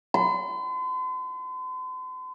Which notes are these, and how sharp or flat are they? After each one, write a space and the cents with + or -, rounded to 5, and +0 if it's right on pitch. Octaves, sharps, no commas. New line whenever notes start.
C6 -45